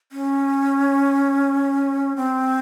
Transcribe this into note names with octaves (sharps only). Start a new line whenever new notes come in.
C#4
C4